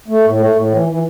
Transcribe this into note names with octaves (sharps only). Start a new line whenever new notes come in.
A3
A2
A3
A2
E3
E3